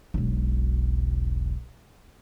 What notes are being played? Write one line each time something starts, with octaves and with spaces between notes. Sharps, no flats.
E1 B1